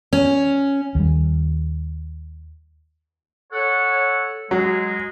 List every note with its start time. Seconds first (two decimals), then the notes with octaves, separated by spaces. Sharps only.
0.13 C#4
0.95 D#2 G3
3.52 A4 C#5 F#5
4.51 F#3 G#3